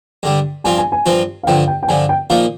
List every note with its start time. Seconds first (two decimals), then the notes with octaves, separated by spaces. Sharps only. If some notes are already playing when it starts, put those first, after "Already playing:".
0.23 G2 D3 G3
0.64 G2 F3 C4 F4 G#5
0.78 G#5
0.92 G#5
1.06 G2 F3 C4 F4
1.43 F5
1.47 G2 D3 F3 G5
1.67 G5
1.83 G5
1.88 G2 D3 F3 G#5
2.09 G5
2.30 A#2 F3 A#3 D#4 F5